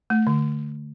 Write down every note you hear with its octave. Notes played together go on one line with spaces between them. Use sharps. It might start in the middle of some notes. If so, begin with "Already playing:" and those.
A3
D3